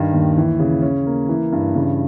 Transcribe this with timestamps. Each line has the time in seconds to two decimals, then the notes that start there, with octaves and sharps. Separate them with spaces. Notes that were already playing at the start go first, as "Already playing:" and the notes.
Already playing: G2 D#3
0.13 D#2
0.37 E3
0.60 C#3
0.82 C#4
1.06 A#3
1.29 E3
1.52 G2
1.75 C#3